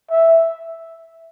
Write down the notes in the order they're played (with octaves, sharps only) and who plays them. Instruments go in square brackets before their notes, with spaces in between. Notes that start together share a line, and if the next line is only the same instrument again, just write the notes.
[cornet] E5